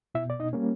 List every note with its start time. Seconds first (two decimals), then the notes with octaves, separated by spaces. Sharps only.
0.15 B2 E4 E5
0.30 D5
0.40 D#4 D#5
0.53 G3 A#3 C#4